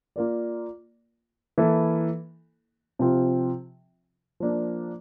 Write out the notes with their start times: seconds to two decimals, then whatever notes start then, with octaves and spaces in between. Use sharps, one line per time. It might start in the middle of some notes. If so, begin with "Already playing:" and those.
0.16 A#3 F4 A#4 D5
1.58 E3 A#3 E4 A4
2.99 C3 F3 C4 F4
4.40 F3 A#3 D4